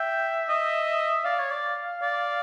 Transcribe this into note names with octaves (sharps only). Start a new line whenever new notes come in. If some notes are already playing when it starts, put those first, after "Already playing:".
Already playing: E5 G5
D#5
D5 F5
C#5
D5
D5